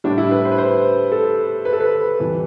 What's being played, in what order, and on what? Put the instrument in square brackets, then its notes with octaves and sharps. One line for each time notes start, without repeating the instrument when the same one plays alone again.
[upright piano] A2 G3 D4
E4
B4
C5
B4
C5
A4
B4
A4
B4
F2 E3 G3